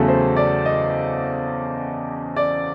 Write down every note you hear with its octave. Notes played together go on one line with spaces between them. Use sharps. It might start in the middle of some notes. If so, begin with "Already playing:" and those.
Already playing: E2 C#3 F#3 A3 A4
C5
D5
D#5
D5